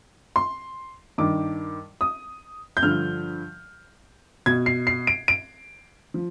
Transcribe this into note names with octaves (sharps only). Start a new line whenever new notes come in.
C6
G2 D#3 D6
D#6
G6
G2 D3 F3 F6
B2 G#6
C7
C7
D7
D7
F3